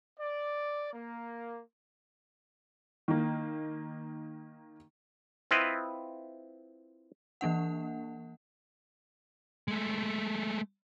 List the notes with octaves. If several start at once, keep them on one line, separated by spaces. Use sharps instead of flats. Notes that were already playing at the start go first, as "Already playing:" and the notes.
D5
A#3
D#3 A#3
C4 E4 F4 B4 D#5
E3 A#3 D4 F#5
G#3 A3